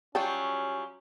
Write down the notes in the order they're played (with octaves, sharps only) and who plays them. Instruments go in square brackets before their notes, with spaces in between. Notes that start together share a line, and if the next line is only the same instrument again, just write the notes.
[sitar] F#3 G3 F4 [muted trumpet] C#4 [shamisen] C#5 G5 A5